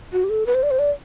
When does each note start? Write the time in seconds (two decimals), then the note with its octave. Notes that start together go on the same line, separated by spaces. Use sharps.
0.13 F#4
0.24 G4
0.30 A4
0.46 B4
0.54 C5
0.63 D5
0.71 C5
0.79 D5